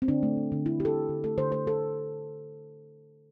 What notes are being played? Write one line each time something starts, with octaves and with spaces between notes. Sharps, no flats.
C4
D3 D4
A3
D3
D3
D3 E4
A3 G4
A4
A3
D3
A3 A4
D3 C5
A3 C5
A3 A4